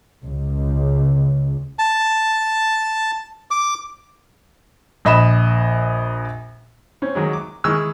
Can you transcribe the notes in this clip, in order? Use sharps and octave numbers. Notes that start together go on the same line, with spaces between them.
C#2
A5
D6
A#1 D#5 B5 E7
C4 C#4
D#3 F#3 G#3
D6
D#3 E3 G#3 C#6 E6 F6